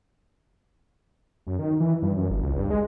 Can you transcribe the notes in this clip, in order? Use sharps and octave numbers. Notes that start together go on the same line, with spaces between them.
F#2
D#3
E3
G2
F#2
G1
C#2
G2
G#3